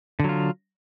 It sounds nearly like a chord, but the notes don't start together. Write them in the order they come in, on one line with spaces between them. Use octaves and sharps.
D3 F#3 F4